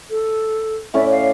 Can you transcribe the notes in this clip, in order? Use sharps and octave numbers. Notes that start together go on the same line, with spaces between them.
A4
A2 C#4 D5 E5
F5